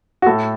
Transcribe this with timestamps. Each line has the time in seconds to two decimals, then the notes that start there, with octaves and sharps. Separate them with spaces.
0.22 F#4
0.26 A2 A4